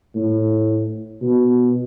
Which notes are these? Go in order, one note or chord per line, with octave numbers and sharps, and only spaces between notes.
A2
B2